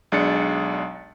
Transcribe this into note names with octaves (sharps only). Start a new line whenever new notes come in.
B1 G#3 D4 A6 C#7